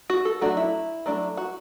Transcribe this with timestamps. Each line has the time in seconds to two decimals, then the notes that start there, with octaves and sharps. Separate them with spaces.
0.10 F#4
0.25 A4
0.41 F#3 A3 D4 F#4
0.57 E4
1.06 F#3 A3 D4
1.37 F#4